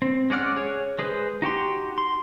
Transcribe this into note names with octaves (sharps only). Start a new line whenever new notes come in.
C4
G#3 C#4 D5 F#5 F6
G#4 C#5
G#3 G#4 B4 C5
D#4 F#4 G4 C6
C6